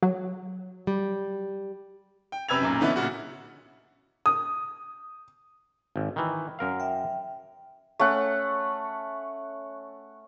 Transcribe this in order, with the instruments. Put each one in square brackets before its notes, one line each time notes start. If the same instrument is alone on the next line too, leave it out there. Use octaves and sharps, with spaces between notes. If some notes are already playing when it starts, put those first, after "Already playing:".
[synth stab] F#3
[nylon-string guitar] G3
[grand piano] G5
F#2 C3 B4 E6 G#6 F7
B1 F#2 A#2
D3 E3 B3 C#4 D#4 E4
A#2 C#3 F#4
[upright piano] D#6
[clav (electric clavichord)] G#1
D#3 E3
F#2 A#4 F5
[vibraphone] E5 G5
[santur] A3 C#4 F#5